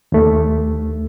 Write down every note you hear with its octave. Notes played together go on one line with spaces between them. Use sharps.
D#2 A3